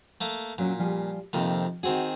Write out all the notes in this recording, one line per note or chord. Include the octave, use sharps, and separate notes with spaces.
A3 A#3
A#2 F#3 C#4
F3 G3 G#4
F2 C3 D#3 A#3 F4
D#3 C4 F#4 G#4